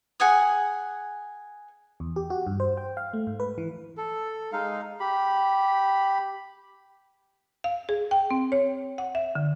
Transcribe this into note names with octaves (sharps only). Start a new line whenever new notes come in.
G#4 F#5 G#5 D#6
E2
G4
F#4
G2
C5
G5
F5
A3
G#2
B4
E3
A4
G#3 D#4 F5
G4 B5
F5
G#4
G5
C4
C#5
F#5
E5
D3